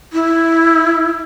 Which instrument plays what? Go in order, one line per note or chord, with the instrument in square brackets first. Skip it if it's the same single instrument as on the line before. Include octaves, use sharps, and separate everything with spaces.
[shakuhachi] E4